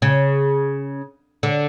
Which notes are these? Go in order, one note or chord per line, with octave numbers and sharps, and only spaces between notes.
C#3
D3